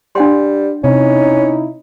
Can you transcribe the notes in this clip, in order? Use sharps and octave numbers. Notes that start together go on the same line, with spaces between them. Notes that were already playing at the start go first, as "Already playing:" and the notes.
G3 D4 F#5 C6
C3 C#4 D#4 E4